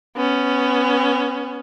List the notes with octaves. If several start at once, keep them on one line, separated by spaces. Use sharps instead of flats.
B3 C#4